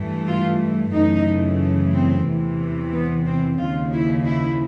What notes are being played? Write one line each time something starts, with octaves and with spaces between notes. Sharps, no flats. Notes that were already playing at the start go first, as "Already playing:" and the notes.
Already playing: G2 E3 A3
F4
F#2 C#3 E3 A3 D#4
C4
E2 C3 E3
B3
C4
D#2 C#3 F3 A#3 F4
E4
E4